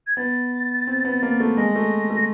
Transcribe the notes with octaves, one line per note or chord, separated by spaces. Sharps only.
G#6
B3 A6
C4
B3
A#3
A3
G#3 A#6
A3
A3